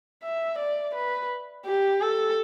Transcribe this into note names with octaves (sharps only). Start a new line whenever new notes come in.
E5
D5
B4
G4
A4